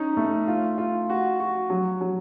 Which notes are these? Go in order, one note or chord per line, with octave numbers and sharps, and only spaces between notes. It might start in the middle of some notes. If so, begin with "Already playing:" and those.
Already playing: C#4 D#4
A3
F4
F4
F#4
F#4
F#3
F#3